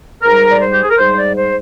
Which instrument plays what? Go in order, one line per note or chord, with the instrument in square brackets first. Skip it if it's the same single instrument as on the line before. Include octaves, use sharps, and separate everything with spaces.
[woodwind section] G#2 G3 A#4
D5
C5
G4
G#4
A#4
G#2 G3 C5
D5
C5